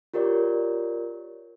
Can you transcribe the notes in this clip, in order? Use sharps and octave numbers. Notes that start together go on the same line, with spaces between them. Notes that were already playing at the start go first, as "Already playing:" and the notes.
F4 G4 A#4 C#5 D5